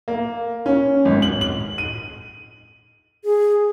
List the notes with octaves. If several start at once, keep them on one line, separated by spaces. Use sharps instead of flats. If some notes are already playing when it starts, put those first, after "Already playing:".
A#3
C#4
G#1
F#7
F#7
D#7
G#4